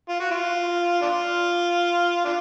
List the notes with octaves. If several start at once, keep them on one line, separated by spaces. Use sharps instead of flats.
F4
F#4
F4
D4 F4
D4 F4